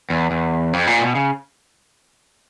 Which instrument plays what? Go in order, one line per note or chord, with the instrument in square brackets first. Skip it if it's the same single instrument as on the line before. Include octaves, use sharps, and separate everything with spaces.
[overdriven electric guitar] E2
E2
F2
A#2
B2
C#3